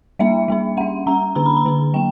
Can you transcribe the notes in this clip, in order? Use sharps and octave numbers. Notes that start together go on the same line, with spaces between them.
G3 A#3 D4 E5
G3 A#3 D4
G3 C#4 F#5
G3 C#4 A#5
D3 A#3 D4 A#5
B5
A#5
D3 A#3 D4
F#3 A#3 G5